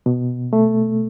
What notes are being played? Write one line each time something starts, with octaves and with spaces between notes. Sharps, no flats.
B2
A3